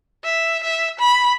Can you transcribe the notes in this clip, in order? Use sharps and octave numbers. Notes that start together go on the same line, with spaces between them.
E5
E5
B5